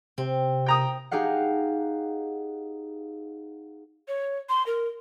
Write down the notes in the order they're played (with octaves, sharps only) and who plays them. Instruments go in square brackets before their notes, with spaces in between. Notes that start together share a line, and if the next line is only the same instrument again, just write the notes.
[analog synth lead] C3 [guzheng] C4
[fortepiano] G5 A#5 D#6
[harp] D#4 G4 G#4 F5 F#5
[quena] C#5
C6
A#4